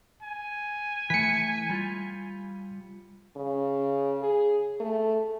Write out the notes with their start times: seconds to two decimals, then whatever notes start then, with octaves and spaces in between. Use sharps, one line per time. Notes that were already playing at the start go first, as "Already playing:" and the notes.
0.23 G#5
1.10 E3 A3 B6 C#7
1.69 G3 F4
3.36 C#3
4.22 G#4
4.80 A3